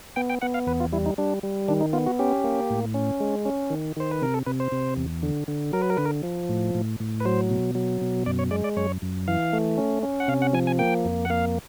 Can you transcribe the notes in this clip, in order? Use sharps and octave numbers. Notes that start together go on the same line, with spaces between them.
B3 G5
G5
B3 F#5
F5
E2 B4
F4
G3 E4
D#4
G3 D4
G3
D#3 D4
D#4
B3 F4
F#4
C#4 G4
A#3
A2
C#4
G#3
C#4
D#3
D#3 C5
B4
C3 A#4
A4
C3 B4
C5
C3
E2
D3
D3
F#3 A#4
B4
A#4
D3 B4
A#4
F3
A2
A2
A2
B4
F#3 C5
B2
F#3
B2
F#2 D5
C#5
G#3 D5
D5
F#2 C#5
F#2
E3 F5
A3
C#4
C#4
F#5
C3 F5
F#5
F3 G#5
G#5
A#3 G5
F2
F#5
A#3 F5